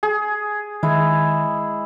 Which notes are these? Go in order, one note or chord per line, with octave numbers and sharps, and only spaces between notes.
G#4
D#3 G#3 E4